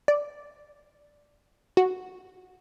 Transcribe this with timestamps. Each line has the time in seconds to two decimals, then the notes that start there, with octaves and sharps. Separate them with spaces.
0.08 D5
1.77 F#4